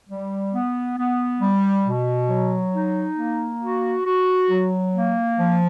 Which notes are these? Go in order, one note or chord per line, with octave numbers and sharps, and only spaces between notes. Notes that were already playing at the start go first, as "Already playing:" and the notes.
G3
B3
B3
G3
B2
F#3
D#4
A#3
F#4
F#4
F#3
A#3
F3